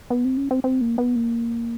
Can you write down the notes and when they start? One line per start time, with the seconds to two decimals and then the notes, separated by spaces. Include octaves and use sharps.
0.10 B3
0.25 C4
0.37 C#4
0.51 C4
0.64 C4
0.81 A#3
0.98 B3
1.16 A#3